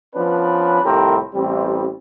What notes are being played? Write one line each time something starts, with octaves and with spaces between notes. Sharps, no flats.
F3 B3 C#4 D4 B4
C2 F2 A2 C4 G4 A#4
A1 G3 C4